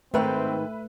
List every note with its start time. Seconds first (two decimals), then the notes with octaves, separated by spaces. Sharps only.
0.14 G#2 D#3 A3 C4 B4 E5 G5